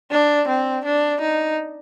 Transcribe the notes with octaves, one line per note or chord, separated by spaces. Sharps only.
D4
C4
D4
D#4